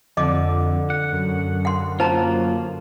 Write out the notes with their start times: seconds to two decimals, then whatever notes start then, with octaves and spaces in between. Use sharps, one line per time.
0.17 F2 D3 D#5 D6
0.90 F#5
1.13 F#2
1.65 F#5 C6
2.00 F#3 A#3 F4 C5 A5 A#5